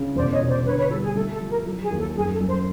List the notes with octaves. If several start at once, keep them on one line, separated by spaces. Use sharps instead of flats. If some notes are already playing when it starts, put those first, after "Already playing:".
Already playing: C#3
E1 C5 D5
C#5 D#5
B2
C5 D5
D3 B4 C#5
B4 C#5
G3 A4
G#4
A3 A4
A4
F3
A#4
F#3 A4
G#4
D#2
A4
F#2 G#4
A4
F#2
C5